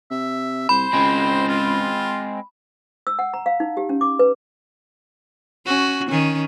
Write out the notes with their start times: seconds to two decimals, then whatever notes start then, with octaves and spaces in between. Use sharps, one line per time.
0.11 C3 E5
0.69 C2 C5 B5
0.94 C#2 G#3 C4
1.48 F4
3.07 E6
3.19 F#5
3.34 A#5
3.46 F5
3.60 D#4
3.77 G4
3.89 C#4
4.01 D6
4.19 B4
5.67 C#4 F#4
6.09 D#3 C#4